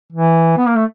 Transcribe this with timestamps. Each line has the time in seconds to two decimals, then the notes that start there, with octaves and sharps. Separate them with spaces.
0.12 E3
0.58 B3
0.67 A#3
0.76 A3